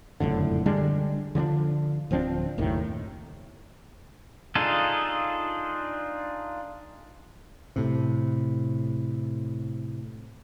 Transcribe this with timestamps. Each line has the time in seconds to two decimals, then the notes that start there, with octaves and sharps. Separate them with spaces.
0.20 F#1 F2 A2 D3
0.66 D3 G3 G#3 D4
1.35 D3 F3 C4 D4
2.11 D1 F3 C4 D4
2.58 F#1 D#2 A2 D#3
4.55 D4 D#4 F4 G#4 A4
7.76 A2 C3